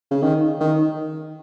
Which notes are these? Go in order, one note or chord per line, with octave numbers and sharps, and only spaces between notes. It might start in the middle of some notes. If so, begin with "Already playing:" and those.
C#3
D#3
D#3